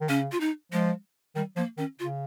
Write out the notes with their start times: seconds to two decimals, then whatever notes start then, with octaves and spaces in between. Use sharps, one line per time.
0.01 D#3
0.09 C#3 C#4
0.32 F4
0.40 D#4
0.72 F3 G#3
1.36 D#3 G3
1.56 F3 A#3
1.77 D#3 C#4
1.99 C#3 F4